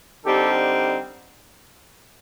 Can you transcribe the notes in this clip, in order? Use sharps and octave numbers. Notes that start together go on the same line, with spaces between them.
D3 G3 C4 D#4 G4 A4